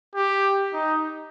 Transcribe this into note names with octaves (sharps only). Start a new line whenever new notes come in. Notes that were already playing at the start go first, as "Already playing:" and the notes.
G4
D#4